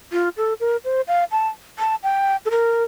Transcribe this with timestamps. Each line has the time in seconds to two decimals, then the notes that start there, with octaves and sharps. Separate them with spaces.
0.12 F4
0.37 A4
0.60 A#4
0.85 C5
1.08 F5
1.31 A5
1.79 A5
2.03 G5
2.46 A4
2.51 A#4